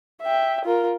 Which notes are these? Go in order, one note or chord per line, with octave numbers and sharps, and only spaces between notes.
E5 G5
F4 A#4